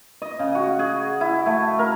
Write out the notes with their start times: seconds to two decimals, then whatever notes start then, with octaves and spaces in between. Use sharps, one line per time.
0.22 D#5
0.39 C#3
0.55 F#4
0.79 G#4
1.21 E4
1.46 A3
1.79 A#4